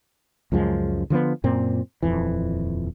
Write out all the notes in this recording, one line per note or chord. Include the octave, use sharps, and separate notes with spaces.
C#2 F#2 F3 G#3
D3 F3 G#3 B3
F#2 A#2 C4
D#1 F2 E3